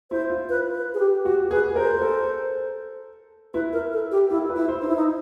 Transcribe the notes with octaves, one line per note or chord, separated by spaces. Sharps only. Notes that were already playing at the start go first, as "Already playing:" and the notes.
E4 C5
F4
B4
B4
G#4
G4
F#4 G4
G#4 B4
A#4 C5
A4
E4 B4
A#4
A4
G4
E4 F4
B4
E4
C5
D#4
E4
D#4